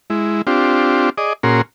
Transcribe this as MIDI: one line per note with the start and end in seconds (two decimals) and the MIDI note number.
0.10 0.42 56
0.10 0.42 64
0.47 1.10 60
0.47 1.10 62
0.47 1.10 65
0.47 1.10 67
1.18 1.33 68
1.18 1.33 74
1.18 1.33 75
1.43 1.62 46
1.43 1.62 61
1.43 1.62 66
1.43 1.62 68
1.43 1.62 70
1.43 1.62 84